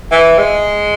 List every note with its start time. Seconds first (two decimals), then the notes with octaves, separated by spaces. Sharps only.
0.12 E3
0.38 G#3